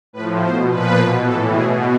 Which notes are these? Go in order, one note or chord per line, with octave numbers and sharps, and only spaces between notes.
A2 F3 B4
B2 C5
A#2 F3 B4
B2
A2 E3 A4
B2 G#4